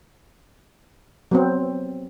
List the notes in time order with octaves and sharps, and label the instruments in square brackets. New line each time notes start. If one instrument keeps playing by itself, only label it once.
[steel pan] F#3 B3 C4